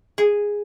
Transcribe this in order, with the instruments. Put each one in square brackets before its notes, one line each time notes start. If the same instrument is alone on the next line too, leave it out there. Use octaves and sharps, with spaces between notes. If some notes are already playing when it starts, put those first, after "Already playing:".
[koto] G#4